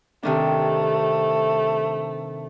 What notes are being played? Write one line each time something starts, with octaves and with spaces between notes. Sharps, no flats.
C3 D#3 A3 D4